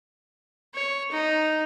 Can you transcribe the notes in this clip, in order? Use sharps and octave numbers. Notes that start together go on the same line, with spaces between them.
C#5
D#4